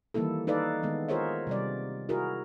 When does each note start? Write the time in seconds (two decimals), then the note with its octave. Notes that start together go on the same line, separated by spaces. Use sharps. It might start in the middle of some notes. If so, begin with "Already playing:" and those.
0.14 D#3 E3 G3 A#3 E4 A4
0.47 D#4 A4 B4 D5 F5
0.83 D#3 G#3 B3
1.09 F4 G#4 A#4 C5 C#5 E5
1.47 C3 G3 D5
2.09 E4 F#4 G#4 A#4